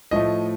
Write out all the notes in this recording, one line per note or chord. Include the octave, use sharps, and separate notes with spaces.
A2 F3 A3 D#5